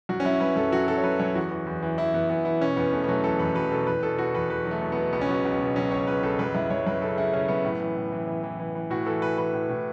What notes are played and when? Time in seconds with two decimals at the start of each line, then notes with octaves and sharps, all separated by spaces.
0.09 F#2 F#4
0.20 C#4
0.25 F#2 E4
0.41 F#2 B4
0.56 F#2 A4
0.72 F#3 F#4
0.88 F#3 A4
0.98 C#5
1.04 F#3 B4
1.19 F#2 C#5
1.35 E2 F#4
1.51 E3
1.67 E2
1.83 E3
1.98 E3 E4
2.14 E2 B3
2.29 E3 B3
2.45 E3 E4
2.61 B2 C#4
2.77 E2 B3
2.93 B2 A3
3.04 B3
3.09 F#3 A3
3.24 E2 A4
3.39 E2 B4
3.55 F#3 B4
3.71 B2 A4
3.87 E2 B4
4.03 B2 A4
4.19 B2 F#4
4.34 E2 B4
4.50 E2 B4
4.65 F#3
4.71 A3
4.82 B2
4.92 B3
4.97 B2
5.13 C#2 B3
5.21 C#4
5.29 F#3 B3
5.45 C#2
5.60 B2
5.76 F#3 C#4
5.91 C#2 C#5
6.07 C#2 B4
6.23 C#2 A4
6.39 F#2 B4
6.55 F#2 E4
6.70 F#2 C#5
6.87 F#2 B4
7.02 C#3 A4
7.17 C#3 E4
7.33 C#3 C#4
7.48 F#2 B3
7.65 A2
7.81 E3
7.96 A2
8.12 E3
8.27 E3
8.43 E3
8.59 E3
8.75 E3
8.90 A2 F#4
9.06 E3 A4
9.22 E3 B4
9.38 E3 B4
9.53 A2
9.69 A2